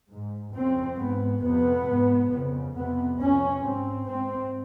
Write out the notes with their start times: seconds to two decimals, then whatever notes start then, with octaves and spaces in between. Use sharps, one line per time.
0.10 G#2
0.55 F2 C#3 C4
0.98 G#2 B3
1.43 F2 C3 B3
1.87 G#2
2.31 F2 C#3
2.75 F2 C3 B3
3.20 F2 C3 C#4
3.64 G#2 C4
4.08 G#2 C4